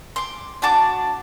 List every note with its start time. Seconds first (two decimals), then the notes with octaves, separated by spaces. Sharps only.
0.16 C6 D6
0.62 D4 F#4 A5 D6